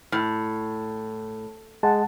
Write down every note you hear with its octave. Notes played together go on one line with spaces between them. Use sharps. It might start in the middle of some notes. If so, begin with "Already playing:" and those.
A2
G#3 F#5 A5